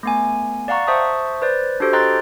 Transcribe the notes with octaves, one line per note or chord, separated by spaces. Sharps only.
A3 B3 G#5
D5 F5 F#5 A#5 C#6
C5 E5 A5 C#6 D#6
B4 C5 D5
D4 F#4 G4 A4 C5
D#5 G5 A#5 C6 F#6 A6